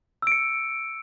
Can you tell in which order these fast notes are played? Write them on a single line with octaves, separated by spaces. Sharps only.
E6 D7 C#7